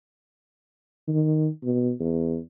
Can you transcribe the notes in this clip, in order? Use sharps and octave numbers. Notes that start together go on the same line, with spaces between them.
D#3
B2
E2